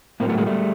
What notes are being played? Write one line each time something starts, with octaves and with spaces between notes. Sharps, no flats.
A2 A#3 C4
F#3 A3 B3
G#3 A#3
G3 A3